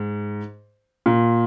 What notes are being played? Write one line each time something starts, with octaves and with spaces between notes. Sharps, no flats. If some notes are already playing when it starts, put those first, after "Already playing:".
Already playing: G#2
A#2